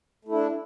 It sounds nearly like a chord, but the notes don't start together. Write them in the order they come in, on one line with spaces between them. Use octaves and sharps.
A3 E4 D4